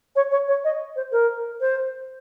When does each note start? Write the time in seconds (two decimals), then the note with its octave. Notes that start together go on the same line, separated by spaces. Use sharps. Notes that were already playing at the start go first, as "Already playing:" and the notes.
0.16 C#5
0.31 C#5
0.48 C#5
0.64 D#5
0.96 C5
1.12 A#4
1.61 C5